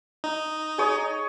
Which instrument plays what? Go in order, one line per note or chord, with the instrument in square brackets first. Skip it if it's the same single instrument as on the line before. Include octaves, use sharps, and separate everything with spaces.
[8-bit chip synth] D#4
[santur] G#4 C#5